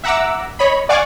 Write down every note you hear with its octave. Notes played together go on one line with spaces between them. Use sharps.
E5 F#5 A#5 D6 E6
C#5 D#5 B5
D5 F5 F#5 G#5 C#6 D6